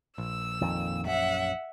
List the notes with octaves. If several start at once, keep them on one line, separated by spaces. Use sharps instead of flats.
A#1 E6
F2 A#2 D#3
F#2 E5 F#5